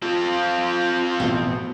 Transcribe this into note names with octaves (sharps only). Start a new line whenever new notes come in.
C4 F4 A4
A1 F2 B2